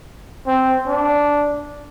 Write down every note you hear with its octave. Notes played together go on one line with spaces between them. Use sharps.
C4
D4